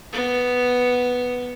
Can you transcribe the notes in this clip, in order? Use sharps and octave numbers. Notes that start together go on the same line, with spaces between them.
B3